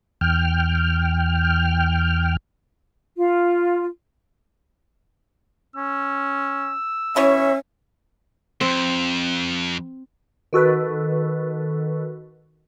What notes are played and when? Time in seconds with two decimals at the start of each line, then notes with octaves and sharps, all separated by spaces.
0.21 E2 G5 F6
3.17 F4
5.76 C#4 E6
7.16 B2 E3 C#4 C#5 E5
8.61 F2 C4
10.53 D#3 F#4 A4 B4